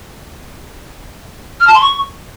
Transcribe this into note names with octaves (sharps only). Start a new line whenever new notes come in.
F6
A5
C6
C#6